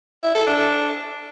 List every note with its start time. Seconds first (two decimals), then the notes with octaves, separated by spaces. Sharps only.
0.23 E4
0.35 A4
0.46 D4